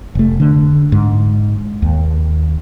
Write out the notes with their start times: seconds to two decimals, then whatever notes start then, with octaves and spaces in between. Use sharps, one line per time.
0.15 F1 A3
0.40 D3
0.92 G#2
1.82 D#2